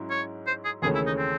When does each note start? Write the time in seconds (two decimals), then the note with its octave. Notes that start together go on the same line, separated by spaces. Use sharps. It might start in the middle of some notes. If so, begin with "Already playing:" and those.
Already playing: G#2 F#3 C#4 E4
0.10 C#5
0.47 C5
0.64 G#4
0.82 D#2 C#3 E3 A3 C#4 G#4
0.95 E4
1.06 D#4
1.18 C4